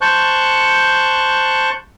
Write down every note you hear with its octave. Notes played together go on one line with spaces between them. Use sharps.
C5 A5 C#6 F#6 G6